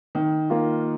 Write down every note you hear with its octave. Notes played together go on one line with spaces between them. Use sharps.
D#3
A#3 F4